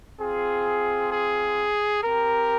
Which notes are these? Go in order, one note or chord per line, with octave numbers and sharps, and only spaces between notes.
C4 F4 G#4
G#4
C4 G4 A#4